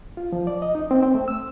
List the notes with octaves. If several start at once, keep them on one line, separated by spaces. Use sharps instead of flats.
F4
F3
D5
D#5
D#4
C4
C4
A3
E6